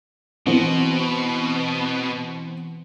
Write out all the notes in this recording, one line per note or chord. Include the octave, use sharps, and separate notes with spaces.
B2 E3 B3 C4